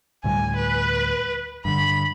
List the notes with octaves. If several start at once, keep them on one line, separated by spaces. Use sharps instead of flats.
D2 A2 G3 G#5
B4
G2 D3 B5